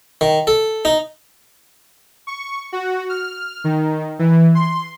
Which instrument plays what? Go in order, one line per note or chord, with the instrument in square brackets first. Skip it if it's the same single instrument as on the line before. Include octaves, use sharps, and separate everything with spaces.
[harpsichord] D#3
A4
D#4
[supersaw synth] C#6
F#4
F6
D#3
E3
C6